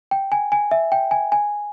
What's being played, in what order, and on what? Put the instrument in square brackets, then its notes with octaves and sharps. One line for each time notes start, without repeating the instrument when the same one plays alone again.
[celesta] G5
G#5
G#5
E5
G5
G#5
G#5